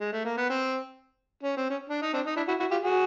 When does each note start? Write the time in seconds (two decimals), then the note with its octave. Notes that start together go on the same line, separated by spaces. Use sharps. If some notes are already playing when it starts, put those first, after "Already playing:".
0.00 G#3
0.13 A3
0.25 A#3
0.38 B3
0.50 C4
1.43 C#4
1.57 C4
1.70 C#4
1.90 D4
2.02 D#4
2.14 C4 D4
2.26 D#4
2.37 D4 E4
2.48 E4 F#4
2.60 E4 F#4
2.71 F4 G4
2.83 F#4 G#4